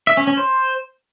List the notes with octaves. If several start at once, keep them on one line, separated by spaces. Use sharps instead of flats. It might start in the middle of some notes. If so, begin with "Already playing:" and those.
E5
C#4
C#4
C5